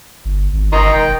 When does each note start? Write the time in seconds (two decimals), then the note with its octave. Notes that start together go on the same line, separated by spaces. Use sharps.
0.25 G1
0.53 G#1
0.72 G1 D#3 D#5 A#5 C6
0.93 E1 G5